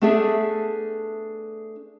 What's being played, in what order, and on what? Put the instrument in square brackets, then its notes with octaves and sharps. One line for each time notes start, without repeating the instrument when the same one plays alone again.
[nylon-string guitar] A3 B3 D4 G#4 A4 E5